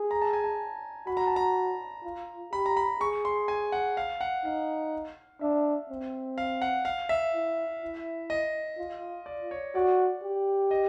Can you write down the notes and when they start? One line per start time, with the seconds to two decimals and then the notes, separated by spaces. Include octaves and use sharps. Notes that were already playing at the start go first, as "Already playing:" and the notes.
Already playing: G#4
0.11 A#5
0.22 A5
0.33 G#5
0.44 A5
1.07 F#4 B5
1.17 A#5
1.27 A5
1.36 A#5
2.03 F4
2.52 G4 B5
2.66 A#5
2.77 B5
3.00 G#4 C#6
3.25 C6
3.48 G#5
3.72 F#5
3.97 F5
4.21 F#5
4.45 D#4 F5
5.41 D4 E5
5.89 C4
6.38 F5
6.62 F#5
6.85 F5
7.09 E5
7.34 E4
7.82 E4
8.30 D#5
8.78 F4
9.26 D5
9.51 C#5
9.75 F#4 D5
10.23 G4
10.71 D#5